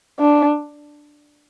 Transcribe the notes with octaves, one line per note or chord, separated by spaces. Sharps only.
D4